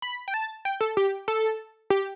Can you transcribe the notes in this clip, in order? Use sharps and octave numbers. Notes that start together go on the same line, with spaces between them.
B5
G5
A5
G5
A4
G4
A4
G4